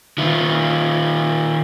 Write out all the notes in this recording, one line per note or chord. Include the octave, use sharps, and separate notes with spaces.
D#3 F4